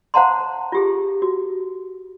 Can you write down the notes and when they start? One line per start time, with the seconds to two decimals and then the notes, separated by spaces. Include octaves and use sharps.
0.14 C5 F5 F#5 A5 A#5 C6
0.72 F4 G4 G#4
1.22 F#4